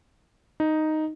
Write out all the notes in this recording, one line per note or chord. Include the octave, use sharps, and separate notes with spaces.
D#4